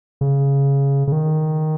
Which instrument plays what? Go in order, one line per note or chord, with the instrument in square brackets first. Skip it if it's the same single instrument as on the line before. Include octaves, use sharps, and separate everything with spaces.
[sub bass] C#3
C#3
D#3